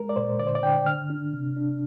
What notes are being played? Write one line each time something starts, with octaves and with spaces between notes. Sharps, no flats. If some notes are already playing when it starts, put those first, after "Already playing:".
Already playing: G#3 A#4
D5
A#2 C5
D3 D5
C5
D5
D3 G5
D3 F6
D4
C3
D4